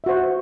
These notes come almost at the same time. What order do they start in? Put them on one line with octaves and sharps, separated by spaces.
E5 F#4 C5